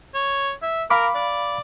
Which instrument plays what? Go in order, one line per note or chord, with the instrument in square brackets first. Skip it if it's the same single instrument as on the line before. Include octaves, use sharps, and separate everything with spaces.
[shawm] C#5
E5
[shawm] A#4 [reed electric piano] F5 B5 D6
[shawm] D5